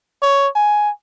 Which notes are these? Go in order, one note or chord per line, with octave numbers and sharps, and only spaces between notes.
C#5
G#5